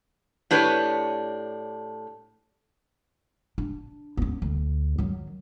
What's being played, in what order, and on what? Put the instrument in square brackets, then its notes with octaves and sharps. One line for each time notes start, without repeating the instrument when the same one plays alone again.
[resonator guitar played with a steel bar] A2 D4 G4 B4 C#5
[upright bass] D4
B3 C#4
D2
D#3 F#3